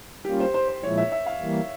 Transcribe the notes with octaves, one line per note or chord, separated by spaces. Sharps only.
G3 A#3 C#4 F4 G4
C5
C5
C5
A#2 F3 G#3 E4 C#5
E5
E5
F5
E3 G3 A#3